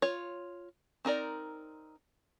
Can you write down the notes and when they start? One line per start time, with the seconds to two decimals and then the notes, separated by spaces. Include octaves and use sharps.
0.02 F4 C#5
1.05 C4 D#4 A#4 D5